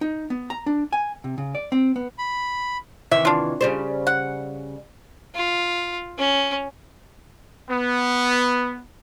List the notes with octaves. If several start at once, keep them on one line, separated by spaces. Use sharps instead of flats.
D#4
B3
A#5
D4
G#5
C3
C#3
D5
C4
B3
B5
C3 D#3 E3 E5
D4 F4
C#3 G3 C5
F#5
F4
C#4
B3